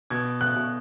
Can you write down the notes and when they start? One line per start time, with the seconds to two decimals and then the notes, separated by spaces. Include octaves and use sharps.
0.10 B2 G#6
0.41 F#6
0.56 B2